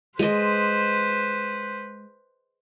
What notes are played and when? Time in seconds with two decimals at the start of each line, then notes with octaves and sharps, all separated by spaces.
0.19 G#3 B4 C5 D#5